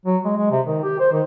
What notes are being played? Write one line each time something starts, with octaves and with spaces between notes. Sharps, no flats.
F#3
G#3
G#3
C3
D#3
G4
C5
D#3